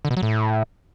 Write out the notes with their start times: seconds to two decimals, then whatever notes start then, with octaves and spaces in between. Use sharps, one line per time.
0.05 D3
0.11 B2
0.17 F#3
0.23 A2